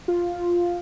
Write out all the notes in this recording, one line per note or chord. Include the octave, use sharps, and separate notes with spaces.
F4